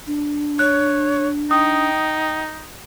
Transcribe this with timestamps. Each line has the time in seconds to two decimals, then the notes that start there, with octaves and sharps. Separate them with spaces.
0.07 D4
0.59 C#5 F#6
1.51 D#4 G5 D#6